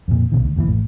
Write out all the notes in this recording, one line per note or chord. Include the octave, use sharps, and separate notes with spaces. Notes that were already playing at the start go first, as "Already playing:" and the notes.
F2 A#2
B1 B2 D#3
D2
F1 D#2 G#2 E3
A1 A2